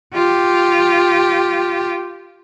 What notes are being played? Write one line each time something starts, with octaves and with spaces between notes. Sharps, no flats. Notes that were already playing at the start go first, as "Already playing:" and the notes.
F4 G4